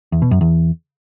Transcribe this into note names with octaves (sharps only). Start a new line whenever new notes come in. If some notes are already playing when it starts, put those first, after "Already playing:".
E2
B2
F#2
E2